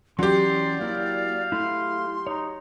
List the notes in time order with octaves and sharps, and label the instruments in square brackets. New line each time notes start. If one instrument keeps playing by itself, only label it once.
[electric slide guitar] E3 C#4 F#4 [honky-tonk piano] F#3 G4 [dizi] D5 [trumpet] C6
[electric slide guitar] A#3 E4 [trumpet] F5
[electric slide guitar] A3 E4 [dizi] C6
[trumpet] D#4 [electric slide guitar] C#5 A#5